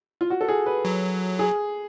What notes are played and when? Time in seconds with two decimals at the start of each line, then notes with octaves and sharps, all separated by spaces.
0.21 F4
0.30 F#4
0.41 A4
0.48 G#4
0.66 B4
0.85 F#3
1.39 G#4